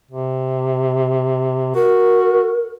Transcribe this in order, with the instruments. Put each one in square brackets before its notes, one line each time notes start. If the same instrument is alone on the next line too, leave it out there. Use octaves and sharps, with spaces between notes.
[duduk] C3
[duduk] F#4 [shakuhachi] A#4